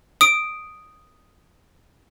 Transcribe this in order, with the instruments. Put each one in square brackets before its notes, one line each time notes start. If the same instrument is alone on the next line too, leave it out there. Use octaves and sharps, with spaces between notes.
[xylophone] D#6 D7